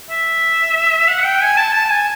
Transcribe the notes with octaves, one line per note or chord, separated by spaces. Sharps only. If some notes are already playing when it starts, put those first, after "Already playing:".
E5
F#5
G5
G#5
A5
A5
G#5